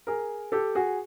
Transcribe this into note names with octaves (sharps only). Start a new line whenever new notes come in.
G#4 A#4
G4 A4
F#4 G#4